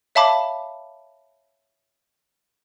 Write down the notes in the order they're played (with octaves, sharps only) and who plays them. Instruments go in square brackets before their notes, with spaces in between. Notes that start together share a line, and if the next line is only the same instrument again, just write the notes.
[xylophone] C#5 E5 F5 A5 B5 D6